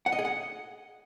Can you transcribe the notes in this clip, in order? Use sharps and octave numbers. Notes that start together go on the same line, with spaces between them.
F#5
D#5
G#4
F#5